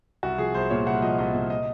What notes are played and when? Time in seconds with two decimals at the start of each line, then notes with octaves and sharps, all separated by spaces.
0.23 C2 F#4
0.38 F3 G#4
0.54 C2 C5
0.70 A#2 C#5
0.87 C2 F#5
1.02 F3 D#5
1.18 C2 D#5
1.34 A#2
1.50 D#5